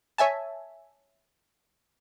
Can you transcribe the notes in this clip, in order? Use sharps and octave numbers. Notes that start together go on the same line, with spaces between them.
C#5 E5 G#5 A5